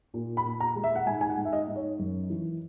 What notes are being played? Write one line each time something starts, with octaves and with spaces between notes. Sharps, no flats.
A#2
B5
A#2
A#5
G#3
E5
F#5
G#2 G#5
G#5
F#5
G#2
E5
D#5
G#2
C#5
F#2
E3